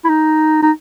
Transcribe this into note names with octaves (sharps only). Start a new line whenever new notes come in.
E4
D#4
D#4